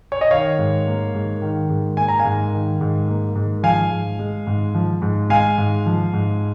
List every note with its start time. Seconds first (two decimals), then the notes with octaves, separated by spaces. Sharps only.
0.12 C#5
0.21 D#5
0.31 D#3 C#5 F5
0.59 G#2
0.86 A#3
1.14 G#2
1.42 D#3
1.70 G#2
1.97 A#3 G#5
2.08 A#5
2.19 F5 G#5
2.25 G#2
2.53 D#3
2.81 G#2
3.08 A#3
3.35 G#2
3.63 F3 F5 G#5
3.91 G#2
4.19 G#3
4.47 G#2
4.75 F3
5.02 G#2
5.30 G#3 F5 G#5
5.58 G#2
5.86 F3
6.13 G#2